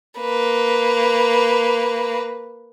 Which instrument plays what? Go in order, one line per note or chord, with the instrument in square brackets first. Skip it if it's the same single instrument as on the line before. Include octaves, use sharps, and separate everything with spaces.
[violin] A#3 B4